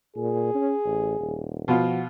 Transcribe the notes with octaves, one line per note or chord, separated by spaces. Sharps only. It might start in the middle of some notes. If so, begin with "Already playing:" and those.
A#2 G#4
C#4
A1
D#1
B2 F3 B3 F4 F#4